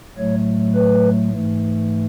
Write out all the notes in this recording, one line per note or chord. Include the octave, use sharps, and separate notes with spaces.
A2 F#3 A3 C#5
B4
G#2 E3 A3